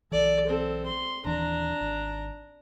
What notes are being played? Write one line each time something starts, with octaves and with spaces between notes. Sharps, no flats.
B1 E3 A4 D5
C4 A4
C6
D#1 D#2 E3 D4 A#5
G#1